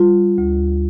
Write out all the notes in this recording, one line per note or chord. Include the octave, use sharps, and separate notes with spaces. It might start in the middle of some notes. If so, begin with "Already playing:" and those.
Already playing: G3 F4
D2